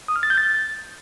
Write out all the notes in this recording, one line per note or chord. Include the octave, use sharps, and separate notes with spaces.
D#6
F6
A6
G6
A6